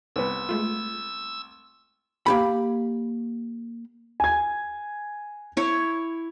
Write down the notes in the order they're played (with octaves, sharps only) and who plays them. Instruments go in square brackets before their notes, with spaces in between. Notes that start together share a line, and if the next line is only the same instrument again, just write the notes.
[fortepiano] C2 B3 [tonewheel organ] E6
[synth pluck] G#3 A3 F4
[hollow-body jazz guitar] A#3 G4 B5
[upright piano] G#5 G#6
[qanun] E4 C#5